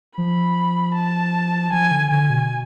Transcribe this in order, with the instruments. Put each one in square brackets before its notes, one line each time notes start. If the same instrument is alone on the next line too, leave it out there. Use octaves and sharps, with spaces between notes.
[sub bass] F3 [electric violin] B5
[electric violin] A5
[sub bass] F3 [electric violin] G#5
[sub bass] D3
[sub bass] D3 [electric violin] G#5
[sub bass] B2